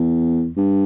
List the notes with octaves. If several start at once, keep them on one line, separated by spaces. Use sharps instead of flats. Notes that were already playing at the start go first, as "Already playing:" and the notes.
Already playing: E2
G2